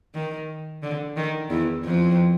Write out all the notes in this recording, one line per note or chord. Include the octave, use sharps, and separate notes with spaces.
D#3
D3
D#3
E2 E3
F2 F3